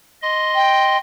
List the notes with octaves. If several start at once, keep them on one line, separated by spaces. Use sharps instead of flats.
D#5 C6
G5